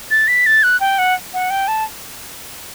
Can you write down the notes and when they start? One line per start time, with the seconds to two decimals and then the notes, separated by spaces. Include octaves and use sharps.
0.11 A6
0.28 B6
0.46 A6
0.63 F#6
0.80 G5
0.99 F#5
1.34 F#5
1.50 G5
1.68 A5